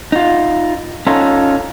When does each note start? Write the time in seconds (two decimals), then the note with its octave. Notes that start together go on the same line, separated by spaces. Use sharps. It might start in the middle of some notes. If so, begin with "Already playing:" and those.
0.12 D#4 F4
1.07 C#4 D#4 F4 A4